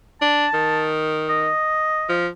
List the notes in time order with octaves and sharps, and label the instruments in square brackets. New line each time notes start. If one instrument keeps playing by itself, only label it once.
[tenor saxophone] D4 [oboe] A5
[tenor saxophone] D#3
[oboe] D#5
[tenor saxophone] F3